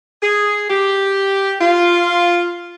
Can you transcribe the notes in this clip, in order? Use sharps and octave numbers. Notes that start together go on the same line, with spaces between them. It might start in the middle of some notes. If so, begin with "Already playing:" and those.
G#4
G4
F4